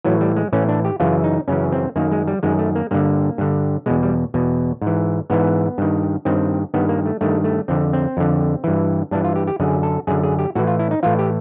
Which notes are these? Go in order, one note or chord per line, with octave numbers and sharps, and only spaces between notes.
A2 E3 F#3
G3
G#3
A2 E3 C#4
D4
G4
F#2 C#3 E3 F4
D#4
F#2 C#3 E3 C#4
C4
F#2 D#3 A#3
G#3
G3
F#2 D#3 G#3
A3
A#3
G2 D3 A#3
G2 D3
E2 B2 G#3
G3
E2 B2
G#2 E3
G#2 E3 B3
G2 D#3
G2 D#3 C4
G2 D#3 B3
A#3
A3
G2 D#3 A3
A3
F2 D3 C4
C4
F2 D3
G2 E3
G2 E3 D4
F4
G4
G4
F#2 D3 G#4
A4
F#2 D3 G#4
G#4
G4
A2 E3 F#4
F4
E4
D#4
A2 E3 F4
G4